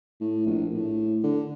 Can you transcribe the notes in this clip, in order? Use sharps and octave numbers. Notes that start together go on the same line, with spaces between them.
A2
A#1
A2
D3